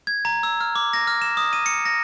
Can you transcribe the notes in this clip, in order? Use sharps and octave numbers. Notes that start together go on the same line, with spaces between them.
G#6
A#5
E6
F6
D6
A#6
F6
E7
D#6
D#7
C#7
A#6